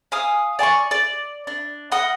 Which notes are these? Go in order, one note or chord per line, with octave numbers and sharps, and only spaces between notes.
F5 G#5 D#6 E6
D5 G#5 C6 C#6
D5
D4
D#5 F#5 D#6